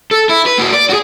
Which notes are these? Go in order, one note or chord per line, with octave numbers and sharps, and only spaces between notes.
A4
E4
B4
A#3 F#4
D5
F#4 G#4